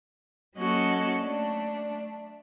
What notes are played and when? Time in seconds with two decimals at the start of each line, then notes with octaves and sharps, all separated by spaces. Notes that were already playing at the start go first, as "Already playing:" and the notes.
0.57 F#3 A#3 C#4 F#4 A4 D#5
1.24 A3 D4